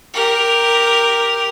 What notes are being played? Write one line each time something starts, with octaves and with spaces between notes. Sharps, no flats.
G4 A#4